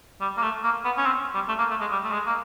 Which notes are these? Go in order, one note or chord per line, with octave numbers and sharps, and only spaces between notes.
G3
A#3
A3
A#3
B3
C#4
C4
G3
A3
A#3
A3
G#3
G3
A3
G#3
A#3